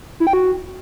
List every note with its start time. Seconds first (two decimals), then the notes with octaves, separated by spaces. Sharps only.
0.20 E4
0.27 G5
0.33 F#4